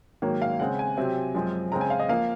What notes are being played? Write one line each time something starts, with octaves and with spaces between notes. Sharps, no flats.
G#2 D#3 F#3 A#3 C#5
F5
C#3 G#3 C4 F#5
G#5
C3 F#3 C4
F#2 F3 G#3 C4
C#3 G#3 C4 A#5
G#5
F5
D#5
F3 A#3 F5